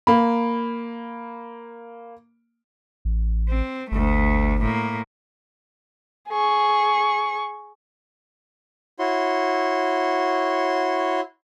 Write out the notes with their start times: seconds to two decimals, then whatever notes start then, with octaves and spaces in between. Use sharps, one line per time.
0.07 A#3 B5
3.05 A1
3.49 C4
3.92 G1 D2 A3
4.61 A2 A#3
6.29 G#4 C#6
8.99 E4 F#4 C#5 C6